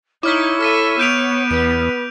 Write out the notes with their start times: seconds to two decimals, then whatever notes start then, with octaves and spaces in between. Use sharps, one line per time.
0.23 D#4 E4 C#5 D6 F6 B6
0.61 A4 E5 F6 B6 D#7
0.99 B3 G6 D7 F7
1.51 E2 B4 D7